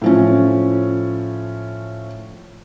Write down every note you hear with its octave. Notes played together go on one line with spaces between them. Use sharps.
A2 F3 C#4